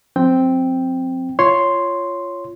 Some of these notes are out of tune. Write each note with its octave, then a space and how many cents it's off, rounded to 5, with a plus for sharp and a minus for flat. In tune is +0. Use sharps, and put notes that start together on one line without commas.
F3 +40 C4 +0 G5 +0
F4 -15 C#5 +0 C6 +0